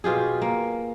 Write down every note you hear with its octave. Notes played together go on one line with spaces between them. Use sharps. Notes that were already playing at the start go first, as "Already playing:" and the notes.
B2 F4 G4 G#4
A#3